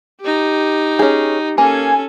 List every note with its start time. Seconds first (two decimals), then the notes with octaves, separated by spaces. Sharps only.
0.21 D#4 G4
0.99 C#4 G#4
1.58 A#3 C#4 A4 G#5